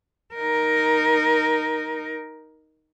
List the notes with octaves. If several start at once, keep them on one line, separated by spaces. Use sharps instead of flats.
D#4 A#4